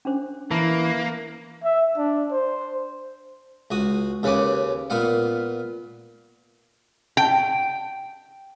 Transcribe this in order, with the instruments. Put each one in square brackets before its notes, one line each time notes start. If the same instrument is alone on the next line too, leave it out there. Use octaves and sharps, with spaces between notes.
[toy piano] C#4 D4 C5
[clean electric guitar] E3 [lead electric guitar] A#3 [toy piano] A5
[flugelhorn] E5
D4
C5
[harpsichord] C#2 F#4 D#6
D#2 C#3 B4 F#5 G#5 D6
A#2 B3 F5 F#5
[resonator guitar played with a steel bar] G5